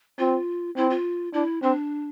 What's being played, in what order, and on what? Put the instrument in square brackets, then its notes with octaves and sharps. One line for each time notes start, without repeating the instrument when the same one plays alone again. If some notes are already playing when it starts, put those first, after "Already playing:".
[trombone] C4 [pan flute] F4
[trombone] C4 [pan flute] E4
[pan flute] F4
[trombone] D4 [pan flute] E4
[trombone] C4 [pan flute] D4